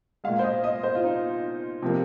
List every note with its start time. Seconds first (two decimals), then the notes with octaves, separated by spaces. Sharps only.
0.24 A#2 G#3 F5
0.39 C5
0.44 D#5
0.64 D#5
0.83 C5
0.95 F4
1.04 D#4
1.82 C3 F3 A#3